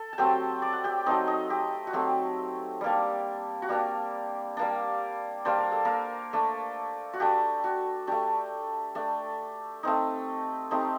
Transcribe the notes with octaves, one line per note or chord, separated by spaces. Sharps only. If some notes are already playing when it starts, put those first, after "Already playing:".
Already playing: A4
A5
F#3 A3 C4 G4 G5
D5 D6
F#5
G4 G5
F#3 A3 C4 D#4 D#5
D#4 D#5
G4
F#4
F#3 A3 C4 G4
G3 A#3 D4
F#4
G3 A#3 D4 G4
G3 A#3 D4
G3 A#3 D4 C5
A#4
A4
A#3 A#4
A3 D4
F#4
A3 D4 G4
F#4
A3 D4 G4
A3 D4
A3 C4 D#4
A3 C4 D#4 G4